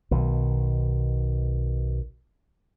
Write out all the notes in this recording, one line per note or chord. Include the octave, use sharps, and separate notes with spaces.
B1 B2 D#3